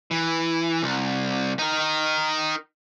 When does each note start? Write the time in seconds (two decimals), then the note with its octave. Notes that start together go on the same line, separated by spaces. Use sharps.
0.11 E3
0.83 C2
1.59 D#4 A#4